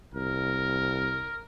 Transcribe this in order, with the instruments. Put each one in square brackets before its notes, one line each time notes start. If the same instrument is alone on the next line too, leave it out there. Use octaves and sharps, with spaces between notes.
[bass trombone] C2 [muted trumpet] A#4